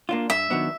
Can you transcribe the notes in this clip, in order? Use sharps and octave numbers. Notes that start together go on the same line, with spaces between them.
A#3 D4 F4
G2 E5
D#3 F#3 B3 D4